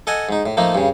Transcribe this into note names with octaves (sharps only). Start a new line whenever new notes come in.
A4 D#5 F#5 G#5
G#2 D#4
A2
F3 A3 A#3 D#4
G2 C#3